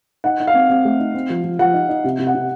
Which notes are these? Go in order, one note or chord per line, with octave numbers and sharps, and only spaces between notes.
D#4 F#5
D#4
F5
C4
C4
A3
D#4
C4
F3
F3
F3 F#5
D#4
D#4
C3
C3
F#5
C3